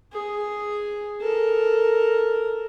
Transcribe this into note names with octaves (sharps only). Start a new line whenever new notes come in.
G#4
A4 A#4